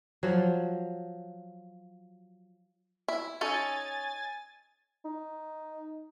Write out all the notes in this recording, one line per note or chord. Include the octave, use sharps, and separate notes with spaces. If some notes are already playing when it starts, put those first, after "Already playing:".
F3 F#3
E4
C#4 D#4 A4 G#5 A6
D#4